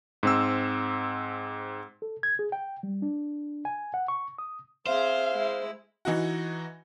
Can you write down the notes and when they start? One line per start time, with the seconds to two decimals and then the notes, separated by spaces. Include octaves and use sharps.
0.23 G#2 C4 E6
2.02 A4
2.23 G#6
2.39 G#4
2.52 G5
2.83 G3
3.02 D4
3.65 G#5
3.94 F#5
4.08 C#6
4.38 D#6
4.86 C4 G#4 C5 E5 F5
5.33 G#3 E4
6.05 E3 D#4 F#4